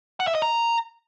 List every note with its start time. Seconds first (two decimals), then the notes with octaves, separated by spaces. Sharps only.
0.20 F#5
0.27 E5
0.35 D#5
0.42 A#5